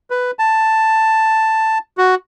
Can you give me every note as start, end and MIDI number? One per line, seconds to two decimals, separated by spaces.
0.10 0.31 71
0.39 1.78 81
1.98 2.15 66